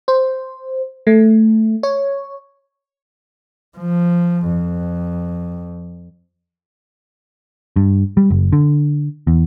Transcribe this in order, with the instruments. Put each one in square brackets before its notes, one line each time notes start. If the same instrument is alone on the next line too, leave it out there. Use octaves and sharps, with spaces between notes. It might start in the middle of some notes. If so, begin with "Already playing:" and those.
[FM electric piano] C5
A3
C#5
[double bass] F3
F2
[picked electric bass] G2
G3
F#1
D3
E2